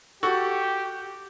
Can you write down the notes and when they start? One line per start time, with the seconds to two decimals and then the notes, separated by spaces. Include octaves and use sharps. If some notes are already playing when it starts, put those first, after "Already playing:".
0.23 F#4 G4 A4